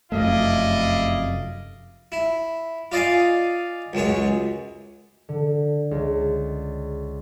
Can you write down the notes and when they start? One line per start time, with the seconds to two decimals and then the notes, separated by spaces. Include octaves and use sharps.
0.12 F1 F#2 A3 E4 D5 D#5 F5
2.12 E4
2.92 F4 D5 D#5 F5 G#5
3.93 C#2 F#2 G#3 C#5
5.29 D3
5.91 C#2
6.21 A6